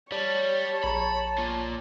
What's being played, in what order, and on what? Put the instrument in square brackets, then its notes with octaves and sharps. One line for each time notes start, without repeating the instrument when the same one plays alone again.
[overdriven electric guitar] G3 [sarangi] C#5 [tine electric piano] D5 [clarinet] A5
[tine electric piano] A#1 A#5 [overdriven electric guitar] B5
[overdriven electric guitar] A#3 F4